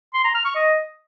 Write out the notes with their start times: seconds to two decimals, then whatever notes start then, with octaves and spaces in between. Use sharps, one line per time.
0.14 C6
0.24 A#5
0.35 F6
0.45 C#6
0.55 D#5